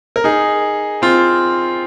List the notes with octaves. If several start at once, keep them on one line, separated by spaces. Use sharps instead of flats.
A#4
D#4 G#4
C4 F4